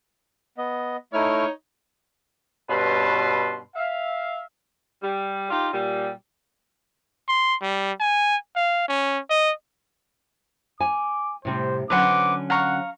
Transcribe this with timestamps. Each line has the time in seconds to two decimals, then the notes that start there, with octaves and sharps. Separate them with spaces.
0.58 B3 D#5
1.13 A3 D#4 E4 C#5 F6
2.69 G2 B2 C#4 B4 A5 C6
3.75 E5 F5
5.02 G3
5.50 D#4 F4 G4
5.72 A#2 G3
7.28 C6
7.62 G3
8.00 G#5
8.56 F5
8.88 C#4
9.30 D#5
10.80 G#5 D6
11.45 A2 C3 G3 C5
11.90 D3 F#3 C#4 B4 C5 F#5 D6
12.50 F5 F#5 A#5 C#6